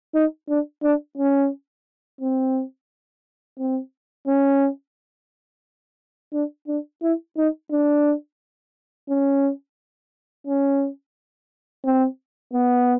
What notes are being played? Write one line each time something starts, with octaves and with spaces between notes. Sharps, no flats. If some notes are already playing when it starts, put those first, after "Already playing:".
D#4
D4
D4
C#4
C4
C4
C#4
D4
D4
E4
D#4
D4
C#4
C#4
C4
B3